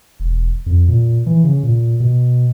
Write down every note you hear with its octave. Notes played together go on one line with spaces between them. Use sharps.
E1
F2
A#2
E3
C#3
A#2
B2